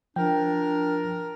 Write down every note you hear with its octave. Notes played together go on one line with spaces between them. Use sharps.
F3 D4 A#4 G5